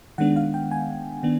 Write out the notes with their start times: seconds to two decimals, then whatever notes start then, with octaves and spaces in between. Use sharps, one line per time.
0.18 D#3 G#3 B3 D4 F#5
0.36 F5
0.54 G5
0.71 G#5
1.23 D#3 B3 D4